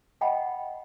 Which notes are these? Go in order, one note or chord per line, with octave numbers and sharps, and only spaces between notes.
D#5 F#5 G5 A5 B5